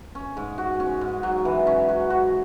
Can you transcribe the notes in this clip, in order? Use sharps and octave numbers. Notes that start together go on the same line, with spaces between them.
C#4
G#2
F#4
C#4
G#2
F#3
E3
C#4
F#4
F#4